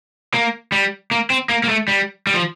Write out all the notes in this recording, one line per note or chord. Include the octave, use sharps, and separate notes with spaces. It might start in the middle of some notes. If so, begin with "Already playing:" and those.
A#3
G3
A#3
C4
A#3
A#3
A3
G3
G3
F3